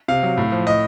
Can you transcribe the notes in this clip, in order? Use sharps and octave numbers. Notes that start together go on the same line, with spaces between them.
C3 F5
F#3
A2
F3
A2 D#5